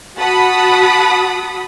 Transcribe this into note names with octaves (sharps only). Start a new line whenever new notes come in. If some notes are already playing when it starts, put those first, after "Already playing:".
F#4 F#5 A5 B5 D#6